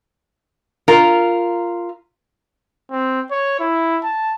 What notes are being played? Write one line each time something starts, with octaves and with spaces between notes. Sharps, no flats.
F4 A#4
C4
C#5
E4
A5